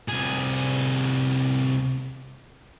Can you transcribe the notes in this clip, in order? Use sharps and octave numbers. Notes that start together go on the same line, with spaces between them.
C2 G#4